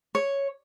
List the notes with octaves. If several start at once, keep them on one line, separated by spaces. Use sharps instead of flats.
C#5